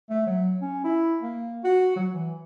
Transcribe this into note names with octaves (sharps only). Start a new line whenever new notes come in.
A3
F#3
C#4
E4
A#3
F#4
F#3
E3